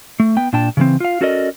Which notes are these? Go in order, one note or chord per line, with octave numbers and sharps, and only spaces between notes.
A3
B3 G5
A#2 D4 G5 A5
C#3 E3 C4
F4 F5
C#4 F#4 A4 A#4 D5 D#5